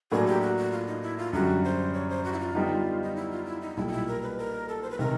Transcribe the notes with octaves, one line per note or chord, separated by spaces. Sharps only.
A2 F#3 A#3 D4 G#4
G4
F#4
F#4
F4
D#4
E4
F4
F#2 D3 G3 F#4
C5
C#5
C5
F#4
E4
F4
D3 G3 B3 D#4
D#4
E4
F4
E4
D#4
B1 A#2 G3 E4
F4
E4
A#4
B4
A#4
A4
C5
B4
C3 D#3 G#3 A#4